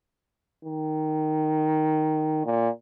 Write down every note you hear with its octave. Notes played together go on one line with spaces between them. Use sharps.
D#3
A#2